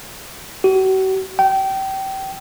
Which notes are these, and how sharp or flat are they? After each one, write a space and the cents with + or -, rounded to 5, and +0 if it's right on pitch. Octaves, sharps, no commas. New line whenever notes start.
F#4 +40
G5 -25